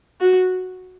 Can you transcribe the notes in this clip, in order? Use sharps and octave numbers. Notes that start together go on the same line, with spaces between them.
F#4